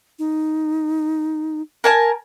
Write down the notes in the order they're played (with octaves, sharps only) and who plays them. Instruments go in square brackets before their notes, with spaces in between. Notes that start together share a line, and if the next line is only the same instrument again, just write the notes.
[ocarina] D#4
[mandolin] A#4 G#5 A5